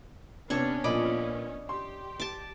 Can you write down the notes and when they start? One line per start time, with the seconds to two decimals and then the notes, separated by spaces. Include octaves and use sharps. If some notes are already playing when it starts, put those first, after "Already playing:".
0.50 C3 B3 C#4 D4 C#5
0.84 A#2 F3 D5 D#5 B5
1.69 G4 C6
2.20 A5 D6